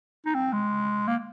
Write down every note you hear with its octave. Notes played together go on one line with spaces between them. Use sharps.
D#4
C4
G#3
A#3